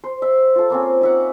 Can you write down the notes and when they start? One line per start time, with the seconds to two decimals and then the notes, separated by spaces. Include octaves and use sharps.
0.04 C5
0.22 E5
0.56 F4 A4
0.70 A#3 C4 C#4
1.01 D#4 E5 F#5